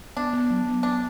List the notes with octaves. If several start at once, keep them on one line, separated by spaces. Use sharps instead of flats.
B3 D4
B3
F#3
B3
B3 D4